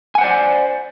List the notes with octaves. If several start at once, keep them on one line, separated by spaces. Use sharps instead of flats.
C5 D5 F#5 G#5